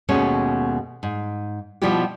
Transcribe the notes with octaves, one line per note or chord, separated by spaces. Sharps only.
D#2 B2 G#3 A3 C#4 C#5
G#2
B2 F3 G3 E4 F4 G4